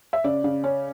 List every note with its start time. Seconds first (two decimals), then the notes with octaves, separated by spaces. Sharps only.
0.13 E5
0.24 C#3 D5
0.44 C#3
0.64 C#4